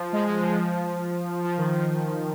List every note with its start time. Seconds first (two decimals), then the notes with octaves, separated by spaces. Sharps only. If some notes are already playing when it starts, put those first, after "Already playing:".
Already playing: F3
0.13 G#3
0.27 G#3
0.42 F3
1.44 F3
1.58 D#3
1.73 F3
1.87 F3